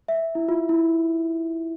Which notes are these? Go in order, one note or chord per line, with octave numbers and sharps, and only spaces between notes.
E5
E4
F4
E4